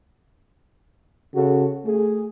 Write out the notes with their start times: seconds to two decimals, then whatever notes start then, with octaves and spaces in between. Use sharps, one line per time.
1.35 C#3 F#4 A4
1.85 A3 G#4